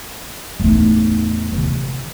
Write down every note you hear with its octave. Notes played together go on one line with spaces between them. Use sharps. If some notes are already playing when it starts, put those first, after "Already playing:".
E2 A2 A3 D#4
C3 E3